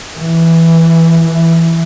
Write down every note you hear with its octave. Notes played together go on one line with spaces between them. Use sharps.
E3
E3